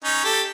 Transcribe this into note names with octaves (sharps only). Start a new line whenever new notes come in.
C#4 D#4
G4 A4